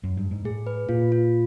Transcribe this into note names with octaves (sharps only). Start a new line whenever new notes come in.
F#2
G2
G#2
A2 G#4
B4
A#2 F4
F4